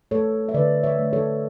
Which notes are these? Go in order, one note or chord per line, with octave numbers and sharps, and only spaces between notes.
A3 A4 C#5
E5
D3 B4 D5
C#5 E5
A3
A4 C#5